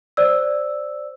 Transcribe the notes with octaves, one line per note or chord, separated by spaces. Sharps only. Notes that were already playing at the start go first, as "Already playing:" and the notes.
C5 D5 E6